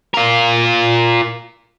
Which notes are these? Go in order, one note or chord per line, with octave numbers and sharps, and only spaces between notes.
F4 A#4